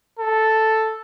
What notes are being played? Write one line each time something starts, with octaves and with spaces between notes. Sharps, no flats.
A4